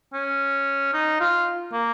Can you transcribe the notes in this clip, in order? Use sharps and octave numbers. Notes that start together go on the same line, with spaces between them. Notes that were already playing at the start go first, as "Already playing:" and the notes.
C#4
D#4
F4
A#3